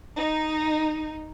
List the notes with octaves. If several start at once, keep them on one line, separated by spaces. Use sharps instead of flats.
D#4